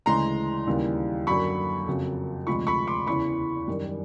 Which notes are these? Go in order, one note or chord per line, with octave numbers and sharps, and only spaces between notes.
D2 C#3 E3 G#3 A#5 C6
D#2 C#3 E3 G3
F#2 D3 F#3 B5 C#6
F2 C#3 F#3
D2 C3 F3 G#3 B5 C#6
B5 C#6
C6 D6
E2 C#3 E3 B5 C#6
F#2 D#3 G3